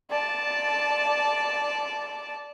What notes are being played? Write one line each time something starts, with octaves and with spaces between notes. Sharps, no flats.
D5 A5